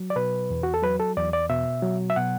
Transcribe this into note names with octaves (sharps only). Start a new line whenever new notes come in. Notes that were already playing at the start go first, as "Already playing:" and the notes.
Already playing: F#3
D5
B2 B4
E2
F#4
A4
F#3 B4
A4
E2 D5
D5
B2 E5
F#3
E5
B2 F#5